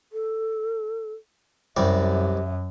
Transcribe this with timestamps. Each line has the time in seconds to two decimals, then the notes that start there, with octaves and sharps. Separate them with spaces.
0.13 A4
1.77 C2 F#2 G3 D5 E5